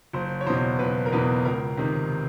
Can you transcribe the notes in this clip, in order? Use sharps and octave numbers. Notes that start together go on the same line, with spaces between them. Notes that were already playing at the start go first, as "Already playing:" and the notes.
F#1 C5
C#5
E2 B2 C5
F#1 B4
A#4
E2 B2 B4
C#2 A#4
C3 D#3